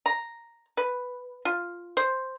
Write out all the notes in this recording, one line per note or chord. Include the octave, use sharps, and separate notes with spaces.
A#5
B4
F4
C5